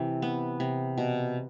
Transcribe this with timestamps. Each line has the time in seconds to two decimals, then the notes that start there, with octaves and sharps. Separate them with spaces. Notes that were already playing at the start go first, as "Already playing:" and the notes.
Already playing: C3 E3
0.22 B3
0.60 C3
0.98 B2